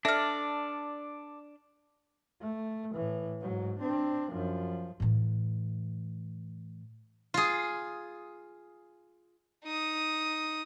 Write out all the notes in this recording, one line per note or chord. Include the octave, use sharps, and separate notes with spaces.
D4 A4 D5 E5 F6
A3
A2 E3
G#2 F#3
C4 D4
F#2 F3
A2 E3
F4 G#4
D#4 D#6